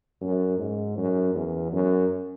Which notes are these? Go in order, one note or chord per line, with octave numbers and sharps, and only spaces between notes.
F#2
G#2
F#2
E2
F#2